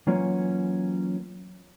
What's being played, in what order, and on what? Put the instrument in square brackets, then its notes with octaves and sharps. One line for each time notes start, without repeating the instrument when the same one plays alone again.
[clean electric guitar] E3 F#3 A#3 C#4 F4 C#5